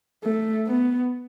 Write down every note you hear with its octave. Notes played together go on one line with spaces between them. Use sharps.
A3
B3